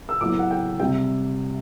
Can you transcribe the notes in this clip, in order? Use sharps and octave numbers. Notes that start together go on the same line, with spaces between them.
E6
A2 F#3 B3 D6
F#5
G5
C3 G3 G5